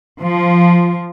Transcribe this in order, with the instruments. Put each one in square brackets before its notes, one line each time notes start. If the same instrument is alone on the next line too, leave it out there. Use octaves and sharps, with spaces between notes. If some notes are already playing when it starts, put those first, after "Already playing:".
[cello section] F3